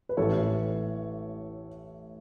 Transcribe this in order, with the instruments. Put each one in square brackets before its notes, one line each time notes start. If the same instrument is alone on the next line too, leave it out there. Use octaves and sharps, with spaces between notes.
[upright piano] B4
A1 A2 E3 A4 C#5